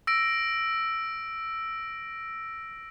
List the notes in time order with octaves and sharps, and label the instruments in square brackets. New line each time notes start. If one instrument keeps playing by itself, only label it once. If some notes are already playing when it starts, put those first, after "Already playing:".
[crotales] E6 A#6 D7